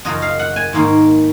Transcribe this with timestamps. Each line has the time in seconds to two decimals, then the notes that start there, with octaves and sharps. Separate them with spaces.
0.05 F#2 C#3 F3 D#5
0.22 F5
0.39 F#5
0.56 G#5
0.73 G#2 D#3 A#3 C#4